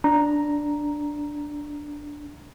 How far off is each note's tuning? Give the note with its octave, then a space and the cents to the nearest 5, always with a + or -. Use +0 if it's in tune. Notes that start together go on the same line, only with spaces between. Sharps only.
D4 +0 A#5 +0